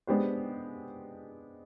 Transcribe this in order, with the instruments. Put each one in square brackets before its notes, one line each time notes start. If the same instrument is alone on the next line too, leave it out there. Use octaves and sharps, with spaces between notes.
[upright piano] G#3 B3 D4 G4 C5